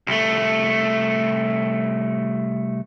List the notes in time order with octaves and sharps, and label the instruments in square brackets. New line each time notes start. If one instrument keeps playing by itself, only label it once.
[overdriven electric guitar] C2 A3